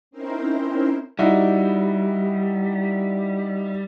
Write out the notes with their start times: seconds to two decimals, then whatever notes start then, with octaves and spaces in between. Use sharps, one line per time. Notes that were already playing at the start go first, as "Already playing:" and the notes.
0.11 C4 C#4 D#4 E4 A#4 C5
1.19 G3 D#4 E4 F#4